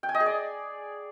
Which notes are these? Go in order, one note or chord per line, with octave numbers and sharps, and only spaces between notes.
G5
G#5
D#5
G#4
D5